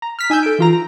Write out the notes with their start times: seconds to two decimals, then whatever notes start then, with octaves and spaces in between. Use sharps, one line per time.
0.02 A#5
0.19 F6 B6
0.30 D#4 G#5 E6 G6
0.43 A4 D7
0.59 E3 F4 A#5
0.73 A#5